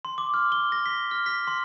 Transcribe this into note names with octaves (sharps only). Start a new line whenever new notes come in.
C6
D6
F6
G7
A#6
B6
F6
B6
C6